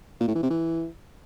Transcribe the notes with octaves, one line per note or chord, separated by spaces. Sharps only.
A#2
A2
E3
C3
E3